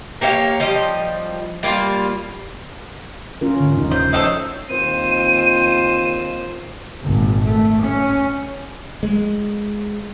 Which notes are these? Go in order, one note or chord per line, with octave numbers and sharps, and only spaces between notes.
A#3 G4 C#5 F5
F3 G3 D#5
G3 A#3 F4
C#4 F4 A#4
G#2 D3
D#1 F3 D#4
C5
D#4 A4 C5 C#5
D#2 C4 F4 C5 D#7
G#1 A#2
A3
C#4
G#3